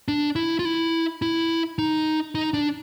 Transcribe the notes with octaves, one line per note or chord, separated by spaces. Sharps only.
D4
E4
F4
E4
E4
D#4
D#4
D4